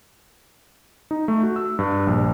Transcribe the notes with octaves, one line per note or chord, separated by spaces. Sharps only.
D#4
A3
F#4
E6
G2
A#1